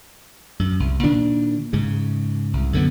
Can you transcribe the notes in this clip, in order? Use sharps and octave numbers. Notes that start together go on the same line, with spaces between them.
F#2
C2
A#2 D#3 D4
G#2 C#3
C2
F#2 D3 B3